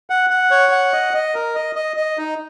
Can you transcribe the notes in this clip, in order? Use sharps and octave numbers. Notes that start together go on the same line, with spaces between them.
F#5
F#5
C#5
F#5
D#5
D#5
A#4
D#5
D#5
D#5
D#4